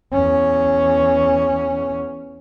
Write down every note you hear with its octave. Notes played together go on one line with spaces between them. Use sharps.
E2 C#4